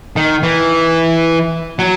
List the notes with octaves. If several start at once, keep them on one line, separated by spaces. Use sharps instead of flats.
D#3
E3
F#3